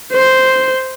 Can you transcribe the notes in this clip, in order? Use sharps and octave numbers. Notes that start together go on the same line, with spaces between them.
C5